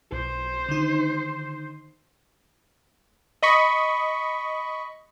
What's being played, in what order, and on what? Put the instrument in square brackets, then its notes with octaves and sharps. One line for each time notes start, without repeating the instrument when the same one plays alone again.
[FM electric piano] B1 [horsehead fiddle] C5
[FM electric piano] D3 D#3 D#4
[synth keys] D#5 B5 C#6